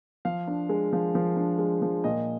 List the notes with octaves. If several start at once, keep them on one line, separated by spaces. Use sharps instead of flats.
F3 F5
D4
G#3
F3
F3
D4
G#3
F3
A#2 D#5